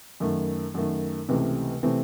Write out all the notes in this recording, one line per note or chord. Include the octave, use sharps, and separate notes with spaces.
F#2 D#3 A3
F#2 D#3 A3
C#2 C3 E3 A3 C4
C3 E3 A3 C4